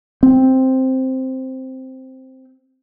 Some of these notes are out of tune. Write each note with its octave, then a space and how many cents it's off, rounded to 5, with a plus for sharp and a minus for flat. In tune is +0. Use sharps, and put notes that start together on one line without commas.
C4 +0